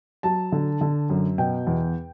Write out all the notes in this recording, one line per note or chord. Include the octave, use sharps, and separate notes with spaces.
F#3 A5
D3
D3
F#2
B2 G5
E2